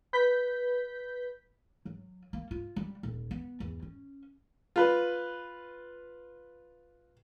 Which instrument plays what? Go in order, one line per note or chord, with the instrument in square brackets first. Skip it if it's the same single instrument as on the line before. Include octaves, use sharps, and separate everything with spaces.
[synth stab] B4 G6 B6
[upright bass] F#3
A#3
F4
G3
D#1
B3
E2
C#4
[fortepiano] F4 B4